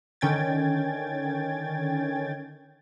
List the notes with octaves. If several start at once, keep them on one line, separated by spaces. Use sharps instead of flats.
D3 D#3 C#4 G5 G#6 A6